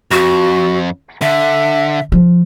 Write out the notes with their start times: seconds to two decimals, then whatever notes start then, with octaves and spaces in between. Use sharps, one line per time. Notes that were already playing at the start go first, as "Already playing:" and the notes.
0.11 F2 F#4
1.22 D3 E5
2.12 F3